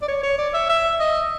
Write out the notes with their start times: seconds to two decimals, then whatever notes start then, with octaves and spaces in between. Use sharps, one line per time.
0.02 D5
0.08 C#5
0.23 C#5
0.38 D5
0.54 E5
0.69 E5
1.00 D#5